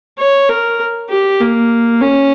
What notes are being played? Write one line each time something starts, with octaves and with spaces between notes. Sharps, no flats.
C#5
A#4
G4
A#3
C#4